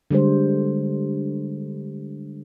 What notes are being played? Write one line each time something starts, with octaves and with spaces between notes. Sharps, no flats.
D3 G3 G#3 C5